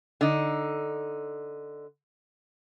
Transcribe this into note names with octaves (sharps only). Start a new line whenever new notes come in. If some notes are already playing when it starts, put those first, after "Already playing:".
D3 D#4